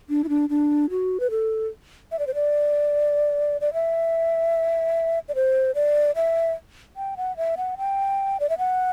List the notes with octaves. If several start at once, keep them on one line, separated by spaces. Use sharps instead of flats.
D4
E4
D4
D4
F#4
B4
A4
E5
D5
C5
D5
D5
E5
D5
C5
D5
E5
G5
F#5
E5
F#5
G5
D5
E5
F#5